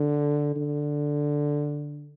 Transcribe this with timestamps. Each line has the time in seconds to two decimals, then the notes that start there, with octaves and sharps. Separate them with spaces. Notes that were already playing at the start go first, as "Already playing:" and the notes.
Already playing: D3
0.56 D3